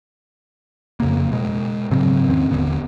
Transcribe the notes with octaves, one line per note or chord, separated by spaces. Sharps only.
F2 C#3 A#3
B2 G#3
G#2 C#3 F#3 C4
E2 D#3 C4 C#4
E1 D#2 D3 B3